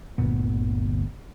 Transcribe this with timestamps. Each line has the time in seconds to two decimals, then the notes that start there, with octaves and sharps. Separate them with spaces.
0.18 G1 D2 A#2 B3